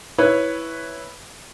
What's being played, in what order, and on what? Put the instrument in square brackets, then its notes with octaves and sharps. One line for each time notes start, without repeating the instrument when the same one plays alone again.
[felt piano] E4 B4 C#5